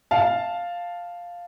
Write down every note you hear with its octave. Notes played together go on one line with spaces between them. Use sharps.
F5 A5